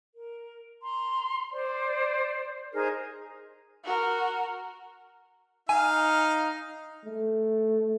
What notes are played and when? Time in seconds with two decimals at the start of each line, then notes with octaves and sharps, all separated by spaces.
0.13 A#4
0.81 A#5 C6
1.52 C5 D5
2.73 D#4 G#4 A#4 C5
3.84 F#4 A#4
5.69 D#4 F5 G#5
7.05 A3